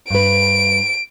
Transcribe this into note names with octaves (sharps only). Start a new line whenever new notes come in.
G2 B4 D7